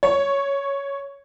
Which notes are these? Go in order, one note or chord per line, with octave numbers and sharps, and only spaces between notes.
C#5